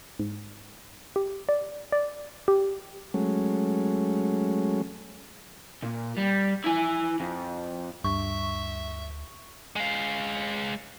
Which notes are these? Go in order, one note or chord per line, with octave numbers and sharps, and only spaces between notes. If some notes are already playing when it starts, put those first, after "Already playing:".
G#2
G4
D5
D5
G4
F#3 G#3 A3 C#4
A#2
G3
E4 G#5
F2
D2 G2 E5 C#6
G#3 F5